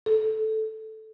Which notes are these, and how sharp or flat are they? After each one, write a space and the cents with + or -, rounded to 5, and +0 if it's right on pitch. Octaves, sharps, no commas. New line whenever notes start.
A4 -5